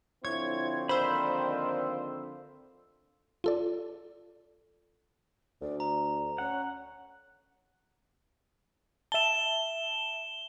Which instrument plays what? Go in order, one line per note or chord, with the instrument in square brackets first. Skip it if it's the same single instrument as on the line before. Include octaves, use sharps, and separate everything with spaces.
[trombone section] D3 F3 C4 [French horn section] E4 [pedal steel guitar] C#5 [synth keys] G#6
[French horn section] D#3 A#3 D5 [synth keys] C5 [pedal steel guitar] E5 B5
[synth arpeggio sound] F4 A4 D5
[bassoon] D2 [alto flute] D5
[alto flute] D5 [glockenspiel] A#5
[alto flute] C#4 [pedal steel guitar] F#5
[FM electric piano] E5 A5 [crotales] E7 G7